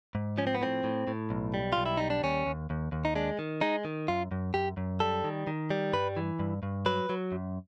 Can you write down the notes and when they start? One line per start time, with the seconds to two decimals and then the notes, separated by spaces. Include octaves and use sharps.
0.15 G#2
0.38 F3 C#4
0.47 C4
0.55 B3
0.61 A2 C4
0.84 A2
1.07 A2
1.30 B1
1.54 G3
1.73 B1 F4
1.86 E4
1.97 G3 D#4
2.10 D4
2.23 D#2 C#4
2.46 D#2
2.70 D#2
2.92 D#2
3.05 D#4
3.15 G#3 D4
3.39 D#3
3.61 G#3 D#4
3.85 D#3
4.08 F#2 F4
4.31 F#2
4.54 F#2 G4
4.77 F#2
5.00 G3 A4
5.24 D#3
5.47 D#3
5.70 G3
5.93 G2 B4
6.17 E3
6.39 G2
6.63 G2
6.86 F#3 B4
7.10 F#3
7.32 F#2